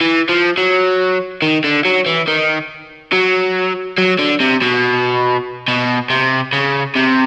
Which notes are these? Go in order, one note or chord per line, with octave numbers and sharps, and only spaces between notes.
E3
F3
F#3
D#3
D3
F#3
E3
D#3
F#3
F#3
D3
C3
B2
B2
C3
C#3
C3